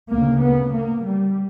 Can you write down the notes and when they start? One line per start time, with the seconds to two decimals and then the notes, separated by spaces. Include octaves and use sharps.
0.12 D2 C#3 A#3
0.42 B3
0.74 A#3
1.04 G3